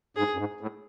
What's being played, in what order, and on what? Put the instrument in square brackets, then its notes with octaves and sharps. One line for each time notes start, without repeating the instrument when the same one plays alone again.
[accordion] G#2 [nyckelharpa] G#4
[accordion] F#2
G#2
A2